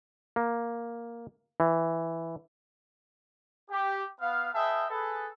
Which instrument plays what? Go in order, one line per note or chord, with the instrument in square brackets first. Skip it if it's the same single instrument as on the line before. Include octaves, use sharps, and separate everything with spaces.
[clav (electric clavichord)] A#3
E3
[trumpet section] G4
B3 F5
G#4 B4 D#5 E5 G5 A5
G#4 A4 B4